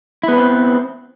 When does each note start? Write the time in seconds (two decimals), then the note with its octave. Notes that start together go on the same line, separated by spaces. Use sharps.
0.23 E4
0.28 B3
0.33 B4
0.38 C4